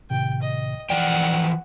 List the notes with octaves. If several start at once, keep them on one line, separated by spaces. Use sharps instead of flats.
A2 C3 D#3 G5
D#5
E3 F3 D5 F#5 G5